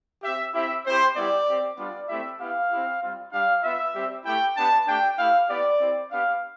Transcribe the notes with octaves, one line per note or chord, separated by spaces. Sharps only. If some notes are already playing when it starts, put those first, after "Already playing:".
C4 G4 E5
C4 E4 G4 E5
C4 E4 G4 C5
G3 B3 E4 G4 D5
C4 G4
G3 B3 D4 F4 D5
A3 C4 E4 G4 E5
B3 E4 G4 F5
C4 E4 G4
G3 C4 F4
G3 D4 G4 F5
B3 F4 E5
G3 C4 G4
A3 E4 G4 G5
B3 D4 G4 A5
A3 D4 G4 G5
A3 E4 G4 F5
B3 E4 G4 D5
C4 E4 G4
B3 D4 G4 F5